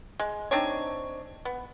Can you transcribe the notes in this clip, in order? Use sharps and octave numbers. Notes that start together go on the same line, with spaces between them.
G#3
C4 D4 D#4 C#5
B3